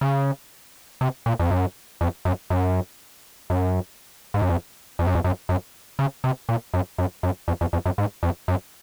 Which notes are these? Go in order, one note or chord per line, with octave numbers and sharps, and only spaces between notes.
C#3
C3
A#2
F2
F#2
F2
F#2
F#2
F#2
G#2
F#2
F2
F2
F#2
F2
F#2
F#2
C#3
C3
A#2
F#2
F#2
F#2
F2
F2
F2
F#2
G#2
F2
F#2